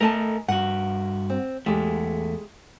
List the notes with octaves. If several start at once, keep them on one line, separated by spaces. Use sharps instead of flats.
A3 A4 A#4 D#5 G#5 A5
G2 F#4 F#5
C4
E2 G#3 A3 G4